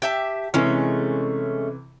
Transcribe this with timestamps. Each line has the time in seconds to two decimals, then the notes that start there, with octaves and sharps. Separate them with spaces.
0.02 G4 E5 A5
0.54 C3 E3 G#3 A3 C#4